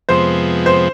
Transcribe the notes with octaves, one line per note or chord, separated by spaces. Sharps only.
F2 C3 F3 G#3 B3 C5
C5